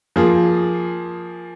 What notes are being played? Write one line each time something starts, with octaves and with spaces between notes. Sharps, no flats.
F3 A#3 F4 G#4